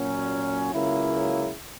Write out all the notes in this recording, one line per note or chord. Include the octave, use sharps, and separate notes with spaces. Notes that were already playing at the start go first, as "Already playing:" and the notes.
Already playing: A#2 F#3 C#4
C#2 C#3 F#3 A#3 E4